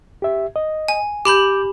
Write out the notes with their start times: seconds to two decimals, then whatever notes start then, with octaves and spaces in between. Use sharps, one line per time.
0.22 G4 E5
0.56 D#5
0.88 G#5
1.25 G4 B5 D6 G6 F#7